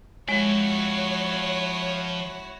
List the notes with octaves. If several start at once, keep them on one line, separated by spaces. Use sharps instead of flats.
F3 G#3 E4 F#4 C#5 G5